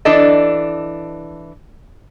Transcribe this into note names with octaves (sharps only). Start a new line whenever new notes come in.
E3 D4 A4 D#5